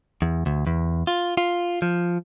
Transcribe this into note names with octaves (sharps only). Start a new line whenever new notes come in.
E2
D2
E2
F4
F4
F3